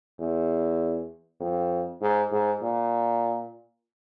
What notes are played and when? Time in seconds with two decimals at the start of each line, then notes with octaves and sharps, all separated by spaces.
0.19 E2
1.40 F2
2.01 G#2
2.31 G#2
2.62 A#2